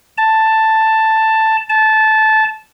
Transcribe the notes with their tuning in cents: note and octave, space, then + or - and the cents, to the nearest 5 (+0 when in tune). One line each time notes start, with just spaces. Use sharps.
A5 +5
A5 -15